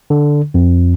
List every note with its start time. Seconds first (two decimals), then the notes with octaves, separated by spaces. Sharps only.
0.10 D3
0.54 F2